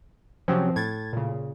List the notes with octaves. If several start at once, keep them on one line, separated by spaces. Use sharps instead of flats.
C3 F3 F#3 C4 C#4
A2 G#6 A6
A#2 C#3